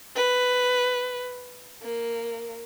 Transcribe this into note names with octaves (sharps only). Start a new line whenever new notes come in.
B4
A#3